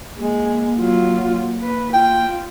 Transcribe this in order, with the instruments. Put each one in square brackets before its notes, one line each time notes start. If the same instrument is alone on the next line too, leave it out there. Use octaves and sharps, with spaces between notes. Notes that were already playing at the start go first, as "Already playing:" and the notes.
[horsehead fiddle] G#3 G#4 [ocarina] A#3
[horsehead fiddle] F#3 F4
B4
[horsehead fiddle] F4 [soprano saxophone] G5